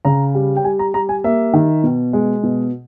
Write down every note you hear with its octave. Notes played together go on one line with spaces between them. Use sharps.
C#3 A#5
G3
G5
G3 G#5
A#5
G3 A#5
G#5
A#3 E5
D#3
B2
G#3
B2